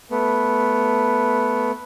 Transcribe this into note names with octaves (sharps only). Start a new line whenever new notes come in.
A3 B3